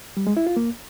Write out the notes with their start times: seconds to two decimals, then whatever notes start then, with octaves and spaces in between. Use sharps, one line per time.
0.17 G3
0.27 G#3
0.37 E4
0.47 F4
0.57 A#3